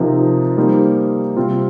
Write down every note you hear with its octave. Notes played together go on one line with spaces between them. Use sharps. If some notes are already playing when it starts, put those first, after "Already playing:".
Already playing: C3 F3 D#4 A#4
G3 A#3 D#4 C5
C3 G3 C4 F4